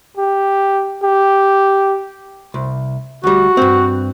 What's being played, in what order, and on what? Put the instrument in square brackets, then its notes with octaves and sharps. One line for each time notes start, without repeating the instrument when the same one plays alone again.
[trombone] G4
G4
[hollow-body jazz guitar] C2
[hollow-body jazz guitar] D2 G3 [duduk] F#4
[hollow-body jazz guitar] G2 C4